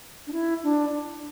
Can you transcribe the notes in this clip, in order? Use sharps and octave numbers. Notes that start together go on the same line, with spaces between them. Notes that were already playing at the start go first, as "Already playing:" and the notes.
D4
E4
D4